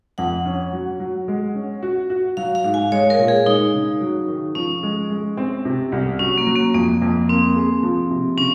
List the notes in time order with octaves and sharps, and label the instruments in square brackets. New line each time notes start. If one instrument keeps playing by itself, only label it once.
[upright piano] F2 [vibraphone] F#5
[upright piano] C#4
F#3
F#3
G#3
C#4
F#4
F#4
[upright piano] F#3 [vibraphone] F5
[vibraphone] F5
[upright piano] G#2
[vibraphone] G#5
[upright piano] G#3 [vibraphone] C#5
[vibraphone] A#4
[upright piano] A#2
[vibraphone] G#4
[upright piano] G#3 [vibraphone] D#4
[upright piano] C#3
F#3
D#3
[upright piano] F3 [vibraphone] C#4
[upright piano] G#3
G#3
C4
C3
C2
[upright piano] F#3 [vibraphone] C#4
[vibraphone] A#3
[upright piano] F#3
[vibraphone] A#3
[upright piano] F2 [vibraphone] A#3
[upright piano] F2
[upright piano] A#3 [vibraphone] C4
[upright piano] G#4
F3
C3
[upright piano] C#3 [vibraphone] C#4